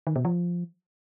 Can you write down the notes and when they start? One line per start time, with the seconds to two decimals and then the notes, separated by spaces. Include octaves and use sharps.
0.07 D#3
0.16 B2
0.25 F3